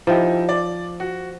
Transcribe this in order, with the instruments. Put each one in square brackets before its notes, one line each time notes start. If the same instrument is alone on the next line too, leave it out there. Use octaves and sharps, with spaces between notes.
[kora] F3 [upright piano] D#4 E4 G4
[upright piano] D5
F#4